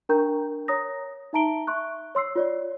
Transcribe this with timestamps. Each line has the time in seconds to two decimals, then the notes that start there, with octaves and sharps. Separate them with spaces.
0.09 D4 A#4 G5 A#5 C#6 G6
0.68 C#5 A#5 D#6 A#6
1.33 D#4 E5 A5 A#5 D7 G7
1.67 E5 C6 C#6 F#6
2.15 C#5 C6 E6 C7
2.36 F4 C#5 D5